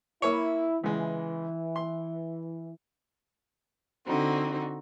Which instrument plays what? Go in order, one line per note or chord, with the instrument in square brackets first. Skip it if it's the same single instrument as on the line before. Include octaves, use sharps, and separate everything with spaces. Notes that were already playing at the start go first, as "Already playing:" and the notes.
[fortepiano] A#3 C#5 [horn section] E4
[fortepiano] C#2 G#3 [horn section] E3
[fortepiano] C6
[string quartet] D3 C4 D#4 F#4